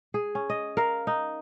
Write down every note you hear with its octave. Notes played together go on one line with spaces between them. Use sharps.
G#4
C#4
D#5
A#4 F5
D#4